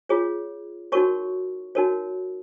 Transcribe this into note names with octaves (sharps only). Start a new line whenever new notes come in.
F4 G#4 C#5
D#4 F#4 A#4 C#5 C#6
D#4 F#4 A#4 C#5